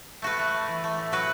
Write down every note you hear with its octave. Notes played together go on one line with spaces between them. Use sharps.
A3 F#4 B4
A3
A3
E3
A3
A2
F#3 F#4 B4